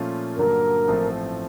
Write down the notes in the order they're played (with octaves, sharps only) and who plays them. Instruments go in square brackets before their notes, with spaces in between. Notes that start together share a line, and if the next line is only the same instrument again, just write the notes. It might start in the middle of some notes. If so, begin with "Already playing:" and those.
Already playing: [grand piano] A#2 F3 A3 C#4 F4
[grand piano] G2 D3 F#3 A#3 [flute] A#4
[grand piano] A1 A2 F3 A3 C4